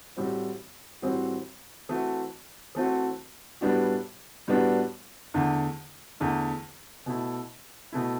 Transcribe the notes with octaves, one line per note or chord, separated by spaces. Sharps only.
A2 E3 G3 C4 F#4
A2 E3 G3 C4 F#4
E3 A3 C4 F#4
E3 A3 C4 F#4
A2 G3 B3 D4 F#4
A2 G3 B3 D4 F#4
E2 D3 A3
E2 D3 A3
B2 A3 E4
B2 A3 E4